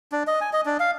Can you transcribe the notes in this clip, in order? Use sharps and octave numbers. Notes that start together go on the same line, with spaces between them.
D4
D#5
G#5
D#5
D4
F5